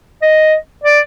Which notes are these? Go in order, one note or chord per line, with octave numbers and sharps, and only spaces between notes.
D#5
D5